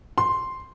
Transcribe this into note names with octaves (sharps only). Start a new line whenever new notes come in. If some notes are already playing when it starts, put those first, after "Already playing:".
C6